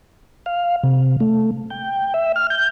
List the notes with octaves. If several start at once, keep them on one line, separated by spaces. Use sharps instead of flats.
F5
C3
A3
G5
E5
F6
G6